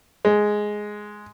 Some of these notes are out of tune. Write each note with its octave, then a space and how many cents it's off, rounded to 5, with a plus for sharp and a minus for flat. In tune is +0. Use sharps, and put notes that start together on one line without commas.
G#3 +5